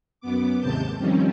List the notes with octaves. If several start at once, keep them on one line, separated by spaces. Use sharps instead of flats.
F#2 B3 D6
D#2 G#2 C3 A5 G6
D#3 F3 G3 C4 C#4